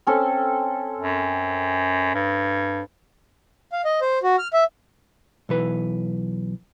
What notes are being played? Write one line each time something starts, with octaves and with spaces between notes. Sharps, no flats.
C4 C#4 A4
F#2
G2
F5
D#5
C5
F#4
F6
E5
B1 E3 B4